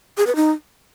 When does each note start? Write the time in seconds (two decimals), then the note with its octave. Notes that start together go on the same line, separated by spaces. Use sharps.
0.17 G#4
0.27 B4
0.36 D#4